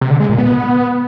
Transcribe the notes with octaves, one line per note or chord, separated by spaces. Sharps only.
C3
D3
G#3
A#2
B3